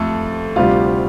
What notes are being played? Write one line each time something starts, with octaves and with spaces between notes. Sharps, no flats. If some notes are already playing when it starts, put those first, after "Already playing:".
Already playing: F2 A3 A4
D2 C3 G3 F4 F5